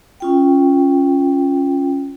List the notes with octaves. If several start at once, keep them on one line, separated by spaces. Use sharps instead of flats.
C#4 F4 G5